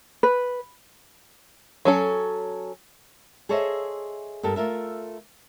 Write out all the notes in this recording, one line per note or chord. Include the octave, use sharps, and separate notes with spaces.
B4
F#3 C#4 A4
G#4 A4 C5 C#5 D#5 E5
G2 G4 A4 A#4
A3 F4 A#4 E5